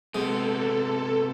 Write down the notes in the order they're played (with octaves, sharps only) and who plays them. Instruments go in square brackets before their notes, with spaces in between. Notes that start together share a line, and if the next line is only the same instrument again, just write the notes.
[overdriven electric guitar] C3 B3 [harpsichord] G#3 [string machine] A4